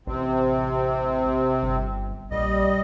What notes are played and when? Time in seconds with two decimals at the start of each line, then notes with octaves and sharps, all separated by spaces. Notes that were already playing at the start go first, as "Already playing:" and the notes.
0.07 A1 C3 C4
1.63 G1
2.31 A#1 G3 D#5